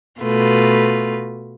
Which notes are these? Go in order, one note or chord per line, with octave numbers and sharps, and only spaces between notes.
B2 A3 F4 B4